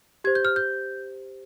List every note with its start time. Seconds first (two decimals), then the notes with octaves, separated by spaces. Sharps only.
0.24 G4 C5 G#6
0.35 G6
0.45 F6
0.56 G6